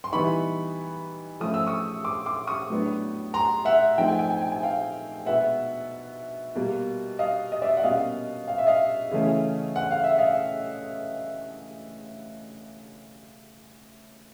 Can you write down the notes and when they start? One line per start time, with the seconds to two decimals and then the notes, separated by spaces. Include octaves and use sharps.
0.04 C6
0.12 E3 G3 B3 D#4 B5 C#6
1.40 F3 A3 C#4 D#6
1.54 E6
1.66 C#6 D#6
2.04 C6 D6
2.26 C6 D6
2.47 C#6 D#6
2.70 A2 F#3 B3 D4
3.34 A#5 C6
3.65 E5 F#5
3.98 F3 A3 C4 D#4 G5
4.08 G#5
4.19 G5
4.30 G#5
4.42 G5
4.52 G#5
4.63 F5 G5
5.26 B2 G#3 B3 E5 F#5
6.55 B2 G3 A#3
7.19 D#5 F5
7.52 D#5
7.62 D5 E5
7.77 F#5
7.83 B2 G3 A#3 C#4 D#5 F5
8.48 F5
8.58 E5
8.67 D#5 F5
9.11 C#3 E3 A3 C#4
9.76 F#5
9.91 F5
10.04 E5
10.18 D#5 F5